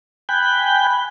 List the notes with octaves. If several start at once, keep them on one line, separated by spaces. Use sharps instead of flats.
G5 G#5 B5 F#6 G6